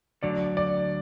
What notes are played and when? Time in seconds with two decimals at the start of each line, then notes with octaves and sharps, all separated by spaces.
0.23 D2 D3 F#3 D5
0.57 D5